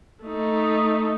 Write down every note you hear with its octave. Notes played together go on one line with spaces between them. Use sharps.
A3 D#4